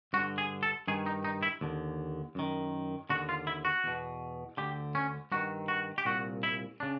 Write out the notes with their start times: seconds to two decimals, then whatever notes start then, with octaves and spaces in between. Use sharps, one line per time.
0.13 G2 F#4
0.17 D3
0.38 G#4
0.63 A4
0.88 G2 D#3 G#4
1.06 D#4
1.24 D#4
1.43 E4
1.61 D#2 D3
2.35 F#2 D#3
3.10 D#2 D3 F#4
3.29 F4
3.47 E4
3.65 F#4
3.84 E2 B2
4.57 D2 D3 G4
4.95 C#4
5.32 G2 D#3 F#4
5.68 F#4
5.98 G4
6.05 C2 A#2 F#4
6.43 E4
6.80 C#3 D4